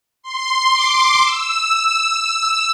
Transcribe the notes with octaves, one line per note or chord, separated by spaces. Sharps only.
C6
D6
E6